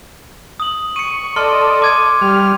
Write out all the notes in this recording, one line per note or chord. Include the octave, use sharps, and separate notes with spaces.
D#6 F#7
C#6 C#7 D#7
A4 D5 D#5 C6 F6 G7
D6 G#6 D#7
G3 F6